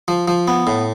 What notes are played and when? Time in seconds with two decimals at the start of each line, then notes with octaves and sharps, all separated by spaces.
0.08 F3
0.28 F3
0.48 B3
0.67 A2